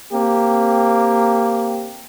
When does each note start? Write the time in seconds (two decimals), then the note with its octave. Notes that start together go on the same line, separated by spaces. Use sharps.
0.12 A#3 C4 G4